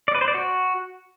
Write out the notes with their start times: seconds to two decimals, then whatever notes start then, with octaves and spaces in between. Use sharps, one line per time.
0.08 D5
0.15 B4
0.21 C5
0.28 D5
0.34 F#4